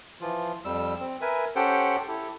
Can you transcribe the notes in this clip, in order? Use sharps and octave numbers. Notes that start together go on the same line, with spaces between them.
E3 F3 F4
F2 G3 E6
C4
A#4 B4 E5 G#5
C#4 G4 A4 C5 F#5 G5
E4 G4 A4